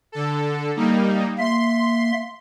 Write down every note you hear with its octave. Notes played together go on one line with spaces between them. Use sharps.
D3 A4
G3 A#3 D#4
A#3 E5 C6